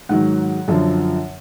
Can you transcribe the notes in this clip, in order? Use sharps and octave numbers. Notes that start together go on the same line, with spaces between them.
G#2 D#3 F#3 F#5
F#2 D3 F3